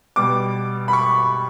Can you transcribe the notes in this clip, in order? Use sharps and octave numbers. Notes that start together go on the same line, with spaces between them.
B2 G3 D6
B5
C#6